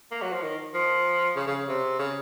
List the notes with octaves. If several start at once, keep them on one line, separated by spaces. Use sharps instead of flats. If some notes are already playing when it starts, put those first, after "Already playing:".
A#3
F#3
F3
D#3
F3
C#3
C#3
C3
C#3